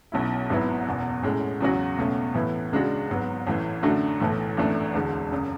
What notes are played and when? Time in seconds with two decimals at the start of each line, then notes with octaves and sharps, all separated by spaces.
0.12 B1 B2 F#3 C#4 E4
0.50 G#1 G#2 F#3 B3 E4
0.87 F#1 E2 B2
1.23 A2 G#3 C#4
1.60 E2 C#3 F#3 C#4 F#4
1.98 C#2 B2 A3 C#4
2.34 A2 E3 B3 E4
2.72 C#2 C#3 G#3 D4 F#4
3.09 G#1 G#2 F#3 B3
3.47 A1 A2 E3
3.83 F#2 D3 A3 D4 F#4
4.20 B1 A2 E3 A3
4.57 G#1 F#2 E3 A3 D4
4.94 E1 D2 D3 G#3
5.32 F#1 F#2 C#3